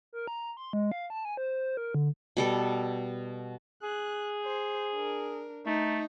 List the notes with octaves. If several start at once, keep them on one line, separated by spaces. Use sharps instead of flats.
A#4
A#5
C6
G#3
F5
A5
G#5
C5
A#4
D3
B2 G3 A4
G#4 F#6
C5
D4 A#4
A3 D#4 A#5